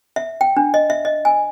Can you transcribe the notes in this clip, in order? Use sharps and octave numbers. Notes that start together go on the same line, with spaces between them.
E5
G5
D4
D#5
E5
D#5
G#5